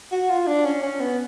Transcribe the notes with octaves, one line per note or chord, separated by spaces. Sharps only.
F#4
F4
D4
C#4
C#4
B3